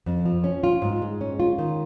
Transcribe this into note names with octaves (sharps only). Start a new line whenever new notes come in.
F2
F3
C#4
F4
G#2
G#3
C#4
F4
D#3